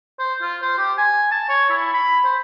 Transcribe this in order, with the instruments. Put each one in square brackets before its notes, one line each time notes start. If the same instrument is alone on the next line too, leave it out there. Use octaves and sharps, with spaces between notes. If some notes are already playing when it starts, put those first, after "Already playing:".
[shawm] C5
F4
C5
G4
G#5
A5
C#5
E4
B5
C5